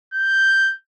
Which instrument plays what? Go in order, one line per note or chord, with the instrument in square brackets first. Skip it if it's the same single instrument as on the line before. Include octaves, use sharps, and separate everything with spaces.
[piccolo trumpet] G6